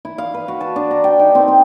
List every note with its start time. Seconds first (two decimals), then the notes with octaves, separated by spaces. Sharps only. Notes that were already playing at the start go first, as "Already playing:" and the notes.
0.05 E4
0.18 F5
0.34 B4
0.48 F#4
0.61 A5
0.76 D4
0.91 A#5
1.04 G5
1.19 D#4
1.35 C4
1.48 C4